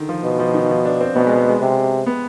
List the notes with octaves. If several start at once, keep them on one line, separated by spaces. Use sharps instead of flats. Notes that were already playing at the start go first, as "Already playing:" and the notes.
Already playing: D3 D#3
F3
B2
F3
D#3
F3
D4
C4
B2 B3
G#3
G#3
G#3
C3
B3